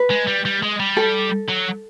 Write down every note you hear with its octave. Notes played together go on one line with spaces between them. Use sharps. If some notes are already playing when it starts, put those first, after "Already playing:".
Already playing: B4
G#3
G3
G3
G#3
G3
A4
F#3